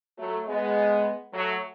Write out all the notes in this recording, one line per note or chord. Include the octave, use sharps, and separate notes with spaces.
F#3 A3
G#3 B3
F#3 A3